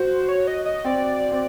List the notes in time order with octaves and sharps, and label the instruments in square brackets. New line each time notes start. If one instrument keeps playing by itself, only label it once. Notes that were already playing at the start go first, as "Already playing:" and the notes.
Already playing: [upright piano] F#4 [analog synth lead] C5
[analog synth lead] C#5
D#5
D#5
[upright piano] C4 [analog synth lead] D5
[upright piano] C4